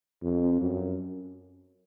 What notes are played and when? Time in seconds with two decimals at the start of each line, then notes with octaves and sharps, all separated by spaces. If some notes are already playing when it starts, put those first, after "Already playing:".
0.23 F2
0.61 F#2